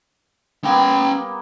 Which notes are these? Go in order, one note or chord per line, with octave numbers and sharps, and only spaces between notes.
G3 A#3 B3 C#4 G5